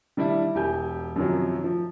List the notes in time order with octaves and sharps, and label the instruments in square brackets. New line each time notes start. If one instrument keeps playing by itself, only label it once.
[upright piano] D#3 G3 D4 E4
E1 G4 G#5 G6
F#2 C3 D#3 F3 F#3
F3